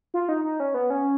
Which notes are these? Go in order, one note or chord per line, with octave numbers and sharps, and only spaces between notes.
F4
D#4
D#4
C#4
B3
C#4